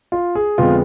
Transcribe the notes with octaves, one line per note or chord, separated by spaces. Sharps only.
F4
G#4
F2 D3 G#3 B3 F4